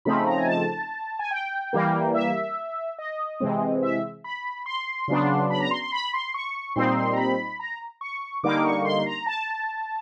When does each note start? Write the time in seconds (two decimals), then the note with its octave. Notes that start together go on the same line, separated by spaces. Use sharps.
0.05 C#3 F3 A3 C4 D#4 B5
0.27 A#5
0.38 G#5
0.47 A5
1.19 G#5
1.31 G5
1.73 E3 G3 A#3
2.14 E5
2.98 D#5
3.40 C3 E3 G#3 C4
3.83 E5
4.24 B5
4.66 C6
5.08 C#3 F#3 B3 D4
5.50 B5
5.60 A#5
5.71 C6
5.81 C6
5.92 B5
6.13 C6
6.34 C#6
6.76 A#2 G3 C4 D#4 C6
6.97 C6
7.13 A#5
7.17 B5
7.60 A#5
8.01 C#6
8.43 D3 G3 A#3 D#4 D6
8.64 C#6
8.85 C6
9.06 A#5
9.26 A5